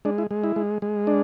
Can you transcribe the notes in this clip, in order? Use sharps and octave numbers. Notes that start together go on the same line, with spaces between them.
G#3 D4
E4
G#3
E4
G#3
G#3
D4